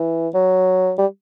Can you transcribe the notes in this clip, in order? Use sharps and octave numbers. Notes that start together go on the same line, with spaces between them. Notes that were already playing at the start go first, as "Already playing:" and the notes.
Already playing: E3
F#3
G3